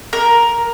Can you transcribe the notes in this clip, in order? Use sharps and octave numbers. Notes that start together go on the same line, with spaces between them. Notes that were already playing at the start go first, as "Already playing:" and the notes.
A#4